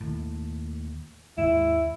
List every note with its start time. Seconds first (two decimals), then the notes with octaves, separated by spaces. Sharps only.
0.01 D#2 A2
1.38 D#2 G#2 G#3 E4